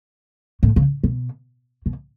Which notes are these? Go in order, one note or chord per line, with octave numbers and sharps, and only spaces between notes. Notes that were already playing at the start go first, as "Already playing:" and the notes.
A2
C#3
B2
B2